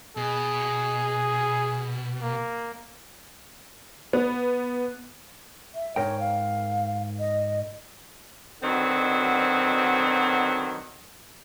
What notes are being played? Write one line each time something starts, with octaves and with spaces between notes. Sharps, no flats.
B2 G#4
A#3
B3
E5
G#2 A#4 C#5 G5
F5
D#5
B2 D3 D#3 F#3 C4